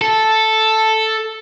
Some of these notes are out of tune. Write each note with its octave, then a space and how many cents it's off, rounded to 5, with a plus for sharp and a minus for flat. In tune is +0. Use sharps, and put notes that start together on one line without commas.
A4 +0